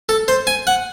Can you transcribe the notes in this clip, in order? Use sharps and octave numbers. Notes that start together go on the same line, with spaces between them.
A4
C5
G#5
F#5